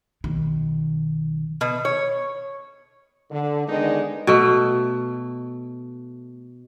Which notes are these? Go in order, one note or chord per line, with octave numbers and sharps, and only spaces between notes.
B1 D#3
B2
C#5
D3
D3 D#3 G#3 B3 D4 D#4
B2 A3